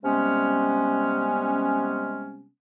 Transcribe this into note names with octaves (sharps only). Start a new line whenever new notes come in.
C3 G3 G#3 B3 C#4